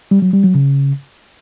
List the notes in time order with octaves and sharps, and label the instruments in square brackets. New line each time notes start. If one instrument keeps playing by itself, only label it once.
[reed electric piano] G3
F#3
G3
F#3
C#3